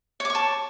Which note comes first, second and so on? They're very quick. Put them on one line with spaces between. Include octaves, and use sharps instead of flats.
C#5 D6 C#6 A5